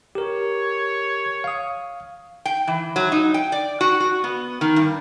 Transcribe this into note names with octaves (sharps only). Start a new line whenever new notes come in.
G4 A#4 C#5
F5 D#6
G5
E3
F#3
D#4
G5
D5
F#4
F#4
B3
D#3
G2